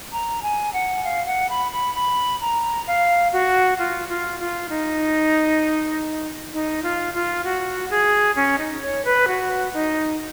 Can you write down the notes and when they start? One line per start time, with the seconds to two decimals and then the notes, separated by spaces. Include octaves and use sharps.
0.12 A#5
0.42 G#5
0.74 F#5
1.04 F5
1.26 F#5
1.50 B5
1.72 B5
1.95 B5
2.41 A#5
2.87 F5
3.33 F#4
3.79 F4
4.09 F4
4.40 F4
4.69 D#4
6.53 D#4
6.83 F4
7.14 F4
7.44 F#4
7.90 G#4
8.36 C#4
8.58 D#4
8.81 C#5
9.05 B4
9.28 F#4
9.74 D#4